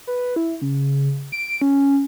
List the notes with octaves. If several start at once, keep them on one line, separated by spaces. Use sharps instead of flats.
B4
E4
C#3
D7
C#4